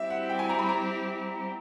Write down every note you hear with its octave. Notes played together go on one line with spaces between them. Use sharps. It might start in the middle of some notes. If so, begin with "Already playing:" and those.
Already playing: G3 C4 E4 G4 E5
F#5
G5
G#5
A#5
B5
A#5